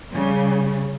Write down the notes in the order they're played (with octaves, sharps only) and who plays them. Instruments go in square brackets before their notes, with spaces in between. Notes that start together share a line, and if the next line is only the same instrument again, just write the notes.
[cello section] C#3 G3